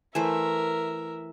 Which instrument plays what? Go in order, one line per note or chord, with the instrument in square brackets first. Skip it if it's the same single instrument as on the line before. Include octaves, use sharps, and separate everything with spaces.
[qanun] E3 A3 C5 [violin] A#4 E5